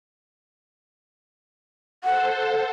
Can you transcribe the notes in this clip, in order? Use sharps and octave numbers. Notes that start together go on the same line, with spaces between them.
A4 C5 F#5